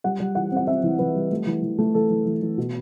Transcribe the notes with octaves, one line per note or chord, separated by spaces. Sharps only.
G3 F#5
G3
E3 F#5
C4 F#5
C4 E5
E3
E3 B4
G3
A3
E3
E3
A3
E3 A4
E3
E3
E3
B2